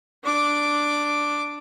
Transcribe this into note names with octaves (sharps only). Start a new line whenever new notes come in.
D4 D6